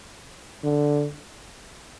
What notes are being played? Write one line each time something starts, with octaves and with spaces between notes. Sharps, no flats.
D3